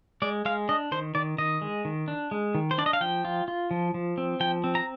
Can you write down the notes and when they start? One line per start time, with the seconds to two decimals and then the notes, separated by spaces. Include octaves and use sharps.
0.22 G#3 D5
0.45 G#3 F5
0.69 D4 D#5
0.92 D#3 C5
1.15 D#3 D5
1.38 D#3 D#5
1.61 G#3
1.85 D#3
2.08 D4
2.31 G#3
2.55 D#3
2.71 C5
2.78 D4 D5
2.86 D#5
2.93 F5
3.01 F3 G5
3.25 F4
3.48 F4
3.71 F3
3.94 F3
4.18 C4
4.40 F3 G5
4.64 C4
4.75 A#5